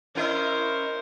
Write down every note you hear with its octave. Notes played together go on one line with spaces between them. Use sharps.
C#4 E4 A#4 C5 D#5